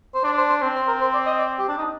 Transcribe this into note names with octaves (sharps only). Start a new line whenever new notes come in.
C5
D4 D5
C5
C5
C4 C5
C5
A#4
C5
D5
D#5
D5
G4
D4
D#4